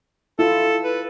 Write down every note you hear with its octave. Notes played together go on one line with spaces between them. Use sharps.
E4 F4 A4
B4